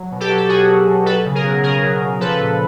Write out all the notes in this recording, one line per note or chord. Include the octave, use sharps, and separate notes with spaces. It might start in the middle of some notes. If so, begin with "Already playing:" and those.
Already playing: F#3
B2
G4 A4
F#3
A4
B2 F#4 G#4
F#3
B2
F#3 A4 B4
C#3
G#4 A#4
F#3
C#3 G#4 A#4
F#3
C#3
F3 A4 B4
A#2